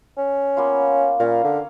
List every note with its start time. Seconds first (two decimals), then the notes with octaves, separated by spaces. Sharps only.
0.18 C#4
0.57 A#3 B3 F4
1.20 A#2 C#4 A#4 F5
1.44 D3